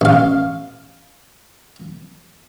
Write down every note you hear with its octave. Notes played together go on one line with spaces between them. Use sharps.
A1 F5